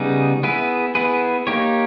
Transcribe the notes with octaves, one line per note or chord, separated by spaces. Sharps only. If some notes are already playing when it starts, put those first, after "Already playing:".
Already playing: C#3 G3 B3 D#4 G#4
B3 E4 G#4 B4
B3 E4 G#4 B4
A#3 D#4 G4 C#5